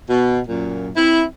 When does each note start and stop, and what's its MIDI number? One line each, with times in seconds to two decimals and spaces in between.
0.10 0.40 47
0.48 0.90 42
0.48 0.90 46
0.97 1.24 60
0.97 1.24 64